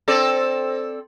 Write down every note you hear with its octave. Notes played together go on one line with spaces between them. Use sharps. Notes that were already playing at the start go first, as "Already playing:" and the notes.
C4 A4 D5